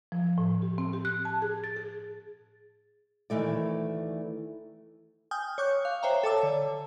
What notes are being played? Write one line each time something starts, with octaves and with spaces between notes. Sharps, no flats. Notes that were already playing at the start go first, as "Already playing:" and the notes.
F3
A2
G4
C4
G4
F#6
A5
G#4
A6
G#4
D2 D#3 E3 A3 D5
G5 G#5 D#6 F6 G6
C#5 C#6 D6 F#6 G6
F5
C5 C#5 E5 G5 A#5
A4 C#5 A5 D6 E6
D3 C#5